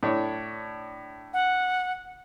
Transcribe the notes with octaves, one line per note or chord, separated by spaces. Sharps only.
A2 D4 C#5
F#5